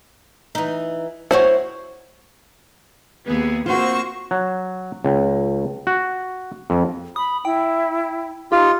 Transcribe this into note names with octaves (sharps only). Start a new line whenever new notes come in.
E3 D#4
E4 F#4 C5 C#5
D#2 B3 G#4
A#3 C4 F4 F#4 C5 C#6
F#3
C#2
F#4
F2
B5 D#6
E4 G5
D#4 F4 G4